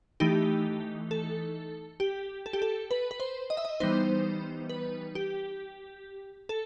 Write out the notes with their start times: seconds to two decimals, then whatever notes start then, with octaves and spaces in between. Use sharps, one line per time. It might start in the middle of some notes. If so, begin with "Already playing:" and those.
0.20 E3 A3 D#4 G4
1.11 A4
2.00 G4
2.46 A4
2.53 G4
2.62 A4
2.91 B4
3.11 B4
3.20 C5
3.50 D#5
3.57 E5
3.65 D#5
3.80 E3 G3 B3 D#4 C5
4.70 B4
5.15 G4
6.49 A4